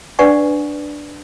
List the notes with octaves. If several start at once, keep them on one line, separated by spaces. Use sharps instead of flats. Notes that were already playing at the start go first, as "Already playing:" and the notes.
D4 B4 D5 F#5 G#5 C#6